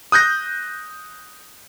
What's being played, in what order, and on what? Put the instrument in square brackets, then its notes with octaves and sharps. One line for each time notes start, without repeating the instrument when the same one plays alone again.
[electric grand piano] D#6 F#6 G6 A#6